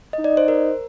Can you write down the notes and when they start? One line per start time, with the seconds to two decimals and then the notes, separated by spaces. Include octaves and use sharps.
0.13 D#5
0.19 D#4
0.24 D5
0.37 C5
0.48 A#4